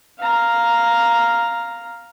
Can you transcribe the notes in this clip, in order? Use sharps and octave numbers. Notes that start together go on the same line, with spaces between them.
F5 A#5